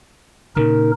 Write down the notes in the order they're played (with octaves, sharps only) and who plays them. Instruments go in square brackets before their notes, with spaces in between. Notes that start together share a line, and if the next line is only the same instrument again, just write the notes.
[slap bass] A#2 C#3 [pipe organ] D#4 A#4